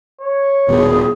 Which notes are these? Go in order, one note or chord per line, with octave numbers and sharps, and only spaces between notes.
C#5
D#1 D#2 B2 G#4